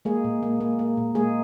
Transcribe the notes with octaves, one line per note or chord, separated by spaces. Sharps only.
G#3 A#3 G#4
A#2
A#3
A#3
A#3
A#2
G#3 A#3 G#4